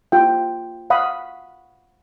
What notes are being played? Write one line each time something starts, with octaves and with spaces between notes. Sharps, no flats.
F4 G5
F5 F#5 B5 D#6